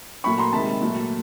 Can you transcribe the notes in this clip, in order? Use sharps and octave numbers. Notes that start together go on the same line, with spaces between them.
A#2 F#3 A3 B5 C#6
A#5 C6
C3 D#3 G#3 A5 B5
A#2 F#3 A3